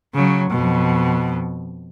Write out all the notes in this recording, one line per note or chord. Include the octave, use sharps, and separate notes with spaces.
C#3 F#3
F2 B2